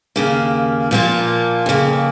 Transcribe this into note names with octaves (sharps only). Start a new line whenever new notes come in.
D#2 C#3 A#3
A#2 F3 A#3 F4
F2 C#3 A#3